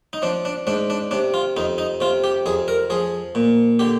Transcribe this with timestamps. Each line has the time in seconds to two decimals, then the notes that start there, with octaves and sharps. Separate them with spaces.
0.13 D#4
0.22 F3 D4
0.45 D4
0.67 G#2 D4
0.90 D4
1.11 C3 D4
1.34 F4
1.57 F2 D#4
1.78 D#4
2.01 C3 F4
2.24 G4
2.46 F2 G#4
2.68 A#4
2.90 F3 G#4
3.35 A#2
3.79 D3 G4